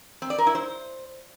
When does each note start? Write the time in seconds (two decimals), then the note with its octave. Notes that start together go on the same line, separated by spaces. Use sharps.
0.22 C4
0.30 D5
0.38 A#4
0.47 E4
0.55 C5